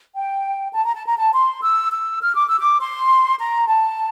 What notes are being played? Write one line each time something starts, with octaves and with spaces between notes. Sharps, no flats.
G5
A5
A#5
A5
A#5
A5
C6
E6
E6
F6
D6
E6
D6
C6
A#5
A5